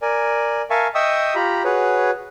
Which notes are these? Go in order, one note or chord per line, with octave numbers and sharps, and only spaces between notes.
A#4 D5 G#5
A#4 E5 F5 G#5 A5 C#6
D#5 E5 G5 C#6 D#6 E6
F4 G4 A#5 B5
F#4 G#4 B4 C#5